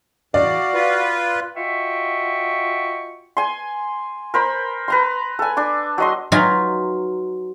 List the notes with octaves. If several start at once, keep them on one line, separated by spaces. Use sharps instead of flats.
E2 F#4 D5 F5
F4 B4
F4 F#4 D#5 E5 G5 C#6
G#5 C6
A#4 C5 B5
B4 A#5 C6
A4 G#5
D4 D6
F#3 D#5 C6
F#3 D#4 F4 B4 G#5 A#5